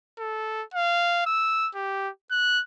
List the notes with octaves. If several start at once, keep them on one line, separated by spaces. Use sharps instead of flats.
A4
F5
E6
G4
F#6